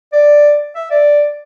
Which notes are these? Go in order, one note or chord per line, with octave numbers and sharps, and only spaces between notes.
D5
E5
D5